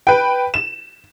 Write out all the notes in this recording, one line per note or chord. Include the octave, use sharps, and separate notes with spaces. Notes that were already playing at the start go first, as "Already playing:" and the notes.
B4 G5
E7